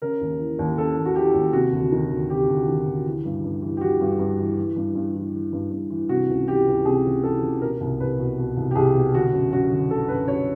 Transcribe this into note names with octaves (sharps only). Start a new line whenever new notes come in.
C#3 A#4
D#2
E3
D#2
C#3 A4
D#2
F#4
E3 G4
D#2
C3 F#4
D2
D#3
D2
C3 G4
D2
D#3
D2
E3
G2
G2
E3
G4
E3 F#4
G2
G2
E3
E3
G2
G2
E3
E3
G2
G2
E3
C3 F#4
C#2
E3 G4
C#2
C3 G#4
C#2
E3 A4
C#2
B2 A#4
C2
C2 B4
B2
B2
C2
G4
C2 G#4
B2
D3 F#4
F#2
F#2 F#4
D3
D3 A4
F#2 B4
F#2 C#5